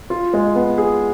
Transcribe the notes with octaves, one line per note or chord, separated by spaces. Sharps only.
F4
G#3
B3
G#4